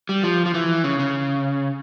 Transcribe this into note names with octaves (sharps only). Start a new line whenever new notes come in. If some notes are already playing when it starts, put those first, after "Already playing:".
G3
F3
F3
E3
C#3
C#3